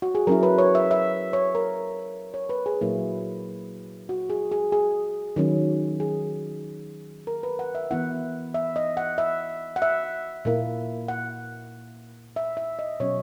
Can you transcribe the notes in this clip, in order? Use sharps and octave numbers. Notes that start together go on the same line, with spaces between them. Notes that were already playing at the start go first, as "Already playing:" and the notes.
F#4
G#4
F#3 C#4 E4 A#4
B4
C#5
E5
E5
C#5
A#4
C#5
B4
G#4
A#2 F#3 A#3 E4
F#4
G#4
G#4
G#4
D#3 F#3 C#4
G#4
A#4
B4
F#5
E5
E3 B3 E4 F#5
E5
D#5
F#5
E5
F#5
E5
A#2 A#3 E4
F#5
E5
E5
D#5
B2 F#3 C#4 C#5